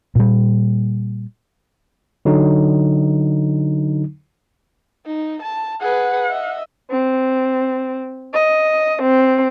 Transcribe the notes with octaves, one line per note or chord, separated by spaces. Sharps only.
A#2 G3
D3 F#3 D#4
D#4
A5
G#4 B4 F#5
D#5 E5
C4
D#5
C4